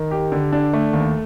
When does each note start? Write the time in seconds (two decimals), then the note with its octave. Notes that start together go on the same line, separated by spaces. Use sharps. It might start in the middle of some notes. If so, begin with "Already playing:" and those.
Already playing: D#3
0.11 G4
0.32 D3
0.53 D4
0.73 A3
0.93 D#2